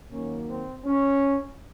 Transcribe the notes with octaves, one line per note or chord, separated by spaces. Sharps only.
D#3 F#3 A#3 C#4
C4
C#4